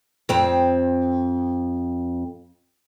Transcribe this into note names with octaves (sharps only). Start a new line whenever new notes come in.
F2 C4